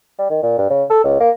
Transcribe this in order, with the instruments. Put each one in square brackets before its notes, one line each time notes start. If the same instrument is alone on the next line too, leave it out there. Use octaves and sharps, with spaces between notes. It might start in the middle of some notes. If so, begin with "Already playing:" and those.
[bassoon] G3
D#3
A#2
G2
C#3
A4
C#2
A#3